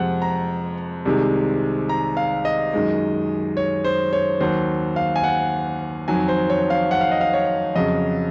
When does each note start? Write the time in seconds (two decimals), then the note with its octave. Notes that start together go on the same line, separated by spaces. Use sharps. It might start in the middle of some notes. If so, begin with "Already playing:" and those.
Already playing: F2 C3 F3 G#3 F#5
0.22 A#5
1.05 C2 C3 D#3 G#3
1.89 A#5
2.17 F5
2.45 D#5
2.73 F#2 D#3 G#3
3.57 C#5
3.84 C5
4.13 C#5
4.40 D#2 D#3 F#3 C5
4.96 F5
5.16 G#5
5.24 F#5
6.08 F2 D#3 F#3 G#5
6.28 C5
6.50 C#5
6.70 F5
6.91 F#5
7.01 F5
7.12 D#5
7.21 F5
7.34 C#5
7.75 F2 C#3 F#3 D#5